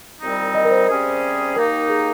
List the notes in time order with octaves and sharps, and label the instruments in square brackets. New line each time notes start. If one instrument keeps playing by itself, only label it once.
[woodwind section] C2 A#2 G3 C4 D#4
[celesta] D#5
A#4
C5
[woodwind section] C3 G3 C#4 G#4
[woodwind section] D#2 D#3 A#3 D#4 [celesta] A#4
[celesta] G#4